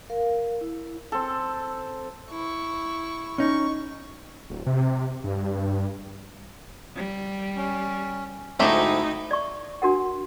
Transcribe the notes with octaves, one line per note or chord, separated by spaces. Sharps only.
A#4 F5
E4
C4 A4
E4 C#6
C#4 D#4 C#6
D1
C3
G2
G3
C#4
D2 G#2 F#3 A3 D#4 E4 G4
D5 C#6
D4 F#4 A#4 F#5